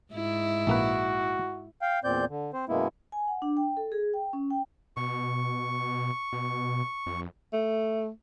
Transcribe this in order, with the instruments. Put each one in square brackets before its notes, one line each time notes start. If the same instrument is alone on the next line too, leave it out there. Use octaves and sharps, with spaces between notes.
[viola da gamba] G#2 E4
[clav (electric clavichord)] A#1 A#3 B4 [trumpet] F#4
[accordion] F5 G5
E2 A#2 C4 D5 G6
D3
C4 C5
F#2 B2 G#3 A#3 B3 E4
[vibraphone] G#5
F#5
D4
G5
A4
G#4
G5
C#4
G5
[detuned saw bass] B2 [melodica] C#6
[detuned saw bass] B2
F2
[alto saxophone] A3